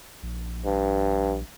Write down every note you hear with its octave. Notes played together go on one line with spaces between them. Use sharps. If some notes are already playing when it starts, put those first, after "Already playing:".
A#1
G2